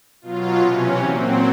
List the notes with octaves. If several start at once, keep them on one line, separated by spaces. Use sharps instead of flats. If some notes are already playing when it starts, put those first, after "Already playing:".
B2 F#3 F4
C3 E3 C#4
A#2 F#3 C4